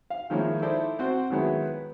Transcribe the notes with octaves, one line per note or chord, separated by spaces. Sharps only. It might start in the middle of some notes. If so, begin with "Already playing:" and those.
F5
D#3 F3 G#3 A#3 C#4 E4
D#4 E4 A4 C5 D5
C4 F#4 C5 F#5
D#3 F#3 G#3 B3 E4
B4